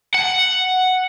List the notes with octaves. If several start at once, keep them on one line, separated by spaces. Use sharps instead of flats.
F#5